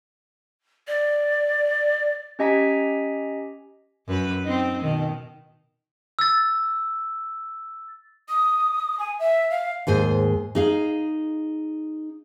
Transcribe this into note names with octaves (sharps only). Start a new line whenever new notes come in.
D5
C#4 G4 D#5 G#5 A#5 B6
F#2 B4
C4 D#4
B2 D#3
E6 A6
D#6
G#5
E5
F5
D#2 G#2 G#4 C5
D#4 G#4 F5